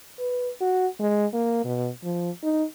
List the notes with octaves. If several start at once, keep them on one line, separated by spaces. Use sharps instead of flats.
B4
F#4
G#3
A#3
B2
F3
D#4